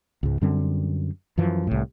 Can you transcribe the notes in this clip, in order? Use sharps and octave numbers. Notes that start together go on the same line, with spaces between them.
C#2 G#2
F#2 D3 G3 C4
F#2 E3 F3
C2 A2